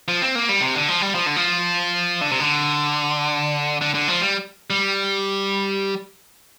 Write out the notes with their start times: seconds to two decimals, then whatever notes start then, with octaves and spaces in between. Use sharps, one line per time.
0.08 F3
0.22 C4
0.35 A#3
0.49 G3
0.62 C3
0.75 D3
0.88 F3
1.02 G3
1.15 F3
1.26 D3
1.36 F3
2.21 D3
2.31 C3
2.40 D3
3.81 D3
3.95 D3
4.08 F3
4.21 G3
4.70 G3